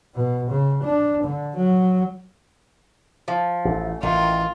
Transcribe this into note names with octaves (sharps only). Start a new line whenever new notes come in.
B2
C#3
D4
D3
F#3
F3
A1 A3
A1 D#3 E3 F4 A#4